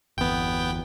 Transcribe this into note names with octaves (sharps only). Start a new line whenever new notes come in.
G1 E2 B3 G5